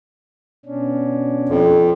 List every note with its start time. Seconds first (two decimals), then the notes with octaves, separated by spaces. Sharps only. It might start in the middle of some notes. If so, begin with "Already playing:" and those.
0.65 B2 C#4 D4
1.49 F2